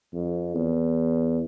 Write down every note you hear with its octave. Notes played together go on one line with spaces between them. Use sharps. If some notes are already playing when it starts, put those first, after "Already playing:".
F2
E2